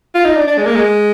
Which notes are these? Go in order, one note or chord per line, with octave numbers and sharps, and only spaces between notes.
F4
D#4
D4
D4
G#3
A#3
G#3